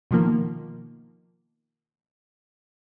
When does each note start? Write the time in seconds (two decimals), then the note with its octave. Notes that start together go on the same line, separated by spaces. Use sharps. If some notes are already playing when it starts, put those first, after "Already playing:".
0.11 B2 D#3 F3 A#3